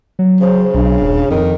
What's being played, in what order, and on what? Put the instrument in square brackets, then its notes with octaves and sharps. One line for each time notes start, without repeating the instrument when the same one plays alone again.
[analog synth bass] F#3
[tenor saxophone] C#3 [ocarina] C5
[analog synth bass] B1 [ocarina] D4
[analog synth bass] D#1
[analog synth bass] F2 [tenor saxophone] D#3